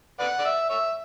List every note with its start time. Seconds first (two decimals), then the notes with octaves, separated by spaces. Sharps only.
0.20 B4 D5 F#5
0.39 D5
0.45 E5
0.70 C#5 E5